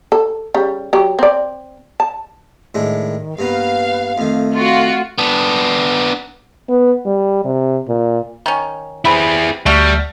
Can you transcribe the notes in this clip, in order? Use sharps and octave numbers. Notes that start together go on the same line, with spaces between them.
A4
C#3 G3
F#3 G4
C4 D5
A5
A2 D#3 G#3 D4
G2 A#3 B3 B4 F5
F2 D#3 A3
F4 F#4
B3 D4
B3
G3
C3
A#2
D#3 C#4
G3 B3 C4 E4 G#4
D2 G3 A3 F#4 F6